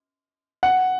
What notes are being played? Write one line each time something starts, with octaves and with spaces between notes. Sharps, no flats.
F#5